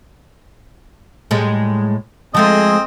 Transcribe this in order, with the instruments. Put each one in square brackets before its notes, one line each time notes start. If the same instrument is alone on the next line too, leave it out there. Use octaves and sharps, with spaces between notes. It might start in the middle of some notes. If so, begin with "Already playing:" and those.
[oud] A2 G3 G#3
[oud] F3 G#3 A3 [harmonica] C4 G#4 D#5